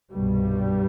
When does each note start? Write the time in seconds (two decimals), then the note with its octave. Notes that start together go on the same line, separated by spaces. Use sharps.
0.12 C2 G2 B2 G3